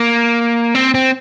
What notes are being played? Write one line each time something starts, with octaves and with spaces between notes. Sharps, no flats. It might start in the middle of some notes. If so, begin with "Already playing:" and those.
Already playing: A#3
C4
C4